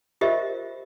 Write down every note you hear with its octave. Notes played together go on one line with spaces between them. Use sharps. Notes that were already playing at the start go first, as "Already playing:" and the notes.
F4 G4 A#4 C5 D#5 E5